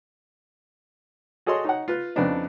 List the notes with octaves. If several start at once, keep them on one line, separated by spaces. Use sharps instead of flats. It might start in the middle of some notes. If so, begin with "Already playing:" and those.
F#4 G#4 A4 C#5 D#5 C6
D#4 C#5 F#5
F4 B4
F2 C#3 B3 C4 D4 D#4